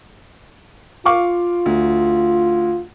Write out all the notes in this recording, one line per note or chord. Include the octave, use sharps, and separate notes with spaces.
F4 F5 C#6 D6
D2